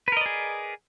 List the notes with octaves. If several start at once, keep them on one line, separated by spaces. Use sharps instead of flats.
G#4 A#4 B4 D5 D#5